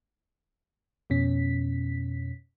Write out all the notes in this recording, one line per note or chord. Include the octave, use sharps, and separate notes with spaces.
F2 B2 C#4 B6